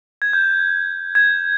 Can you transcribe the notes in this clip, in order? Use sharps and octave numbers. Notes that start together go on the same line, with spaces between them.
G#6
G6
G#6